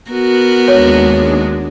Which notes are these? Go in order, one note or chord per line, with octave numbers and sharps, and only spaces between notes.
B3 F#4 A#4
D#2 G#3 D4 C#5